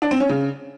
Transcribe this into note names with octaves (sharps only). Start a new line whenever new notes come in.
D4
C4
C#4
C#3